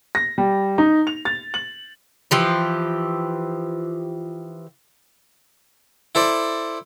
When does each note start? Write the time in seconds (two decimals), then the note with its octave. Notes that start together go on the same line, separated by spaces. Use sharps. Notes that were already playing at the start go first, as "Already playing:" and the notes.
0.15 A#6
0.38 G3
0.78 D#4
1.07 F7
1.25 A6
1.54 F#7
2.31 E3 F3 G4
6.15 E4 A4 C5 D5